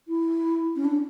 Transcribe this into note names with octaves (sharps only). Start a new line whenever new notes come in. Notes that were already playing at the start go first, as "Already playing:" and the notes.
E4
C#4
D4